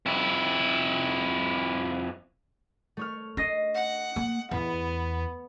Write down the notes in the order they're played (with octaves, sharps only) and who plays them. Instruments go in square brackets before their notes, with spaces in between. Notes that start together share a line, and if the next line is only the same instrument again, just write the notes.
[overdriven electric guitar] F2 E4
[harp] A3 C#5 F6
[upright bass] D4 [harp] D#5 A#6 C7
[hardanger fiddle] F#5
[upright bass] A#3
[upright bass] E2 [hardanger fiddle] B3